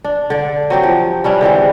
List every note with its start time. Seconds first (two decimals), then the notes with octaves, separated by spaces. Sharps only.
0.04 D4
0.30 D3 D5
0.70 F#3 C4 G4
0.83 F3
1.24 G3 C#4 D4 E4
1.41 D3 E3 G#3 C4